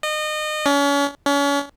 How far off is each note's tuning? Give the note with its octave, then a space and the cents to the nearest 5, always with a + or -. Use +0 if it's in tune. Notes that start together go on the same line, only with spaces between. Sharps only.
D#5 -30
C#4 +35
C#4 +35